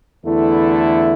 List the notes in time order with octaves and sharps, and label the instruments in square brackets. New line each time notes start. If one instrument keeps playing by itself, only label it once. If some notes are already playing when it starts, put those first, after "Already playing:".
[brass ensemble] E2 D3 A3 E4